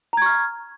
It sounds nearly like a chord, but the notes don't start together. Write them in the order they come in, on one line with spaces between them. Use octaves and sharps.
A#5 G#6 C#6 F6